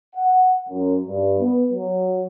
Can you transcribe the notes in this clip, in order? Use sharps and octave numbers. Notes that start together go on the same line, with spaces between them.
F#5
F#2
G2
B3
F#3